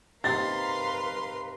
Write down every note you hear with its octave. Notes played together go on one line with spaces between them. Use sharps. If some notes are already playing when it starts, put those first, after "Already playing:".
C3 D#4 A#4 B4 F5 C6 A6